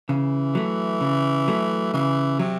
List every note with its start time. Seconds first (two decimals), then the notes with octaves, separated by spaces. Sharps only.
0.09 C#3 E3
0.55 F#3 A3
1.01 C#3
1.48 F#3 A3
1.94 C#3 E3
2.39 C3 F#3